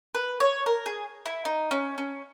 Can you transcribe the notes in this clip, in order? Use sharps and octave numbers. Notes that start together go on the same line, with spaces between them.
B4
C#5
A#4
G#4
E4
D#4
C#4
C#4